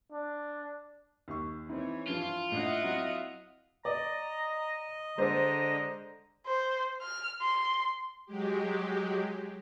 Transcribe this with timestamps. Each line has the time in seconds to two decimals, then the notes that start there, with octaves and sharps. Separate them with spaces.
0.12 D4
1.28 D#2 C#6
1.69 E3 C4 D#4 E4 C#5
2.08 G2 F3 F4
2.52 A2 D4 D#5 E5 F#5
2.83 F#3 C4 E4
3.85 D5 D#5 A#5
5.18 D3 G#3 C5 D5 A#5
6.46 C5
7.02 F6
7.41 C6
8.26 F#3 G#3 G4